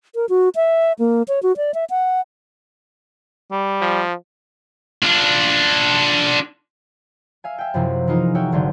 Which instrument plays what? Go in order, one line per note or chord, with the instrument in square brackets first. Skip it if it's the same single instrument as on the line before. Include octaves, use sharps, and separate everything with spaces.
[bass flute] A#4
F#4
E5
A#3
C#5
F#4
D5
E5
F#5
[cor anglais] G3
[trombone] F3
[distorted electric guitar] D4 F4
[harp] E5 F5 G#5
E5 G5
F#2 C3 F3 A#3 C4 E4
E3 A#3 D#4 F4 G#4 A#4
F#4 A#4 C#5 E5 G5
G#1 D3 F3 F#3 G5